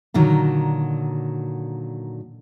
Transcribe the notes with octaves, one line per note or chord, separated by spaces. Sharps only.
A#2 D3 D#3 F#3